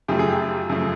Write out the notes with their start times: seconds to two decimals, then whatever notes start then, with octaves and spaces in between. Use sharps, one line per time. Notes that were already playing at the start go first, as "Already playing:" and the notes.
0.08 F#2 C#3 F3 A3 G4
0.19 G#4
0.29 G4
0.69 F#2 C#3 F3 A3